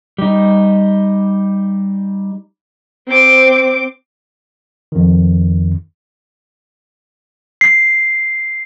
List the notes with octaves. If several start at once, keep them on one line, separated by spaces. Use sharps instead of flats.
G3 D#4
C4 C5 D6
F2 D#3
C7